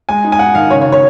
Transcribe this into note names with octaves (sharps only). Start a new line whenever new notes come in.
G#3 G#5
D#4
G#5
D#4 F#5
D#3 F5
C#3 C#5
C#5
C#3
C#5